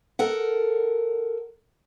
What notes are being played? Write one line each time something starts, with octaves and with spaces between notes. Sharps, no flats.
A4 A#4 F#5